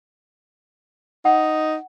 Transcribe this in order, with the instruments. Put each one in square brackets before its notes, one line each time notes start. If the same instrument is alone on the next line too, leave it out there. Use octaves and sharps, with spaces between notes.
[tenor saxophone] D#4 [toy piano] F#5